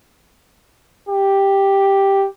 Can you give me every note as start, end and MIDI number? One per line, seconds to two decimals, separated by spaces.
1.09 2.27 67